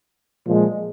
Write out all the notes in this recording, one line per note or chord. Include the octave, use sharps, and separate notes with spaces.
A#2 F3 G#3